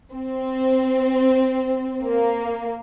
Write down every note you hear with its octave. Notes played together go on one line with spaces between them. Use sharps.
C4
A#3